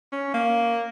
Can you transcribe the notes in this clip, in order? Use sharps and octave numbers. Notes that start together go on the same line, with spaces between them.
C#4
A#3